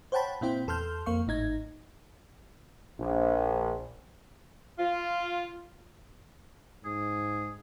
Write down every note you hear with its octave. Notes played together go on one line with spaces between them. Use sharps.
C5 C#5 F#5 G5 A5 B5
A#2 C4 E4 C5 G5
E2 A4 C6 F6 G6
F2 A#3 F5 C#6
G#1 A2 D#4 G#6
A#1
F4
G#2 G#4